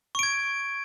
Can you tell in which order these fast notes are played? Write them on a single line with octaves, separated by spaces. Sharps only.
C#6 D7 G#6